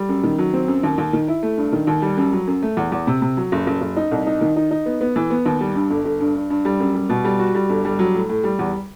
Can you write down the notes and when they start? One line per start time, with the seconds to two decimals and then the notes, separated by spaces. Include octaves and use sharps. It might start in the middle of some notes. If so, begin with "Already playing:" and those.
Already playing: G3
0.09 F#2
0.23 D#3
0.38 F#3
0.53 C4
0.68 F#2
0.83 D#2
0.98 D#2
1.13 D#3
1.28 E4
1.43 A3
1.57 G2
1.72 D#3
1.87 D#2
2.02 G3
2.17 F#2
2.33 F#3
2.47 F#2
2.62 A3
2.77 E2
2.92 E2
3.07 C3
3.22 C3
3.37 F#3
3.52 F#1
3.67 F#1
3.81 F#1
3.97 D#4
4.11 C2
4.27 D#4
4.41 D#3
4.56 D#4
4.71 D#4
4.86 B3
5.01 B3
5.16 E3
5.30 B3
5.46 D#2
5.61 G3
5.75 G2
5.90 G1
6.05 G1
6.20 G2
6.35 G2
6.50 G2
6.65 G3
6.80 F#2
6.95 G3
7.10 B2
7.25 G3
7.39 F#4
7.55 G3
7.69 G1
7.85 G3
7.99 F#3
8.14 A2
8.29 A2
8.44 G3
8.59 E2